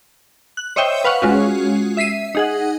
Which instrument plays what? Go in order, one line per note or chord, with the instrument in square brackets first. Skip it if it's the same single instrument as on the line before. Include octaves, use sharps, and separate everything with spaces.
[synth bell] F#6
C5 C#5 D#5 E5 G5
B4 F5 F#5 C#6
G#3 C#4 F4 F#4
E5 B6 C7 D#7
D#4 G#4 F#5